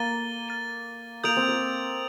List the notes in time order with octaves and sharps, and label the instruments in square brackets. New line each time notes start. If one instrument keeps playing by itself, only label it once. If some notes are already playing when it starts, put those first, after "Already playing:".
Already playing: [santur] A#3 [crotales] F6 A6 D#7 G7
[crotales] F6 A6 D#7 G7
[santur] A#3 [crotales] D#6 G6 D7 F7
[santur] C4
A#3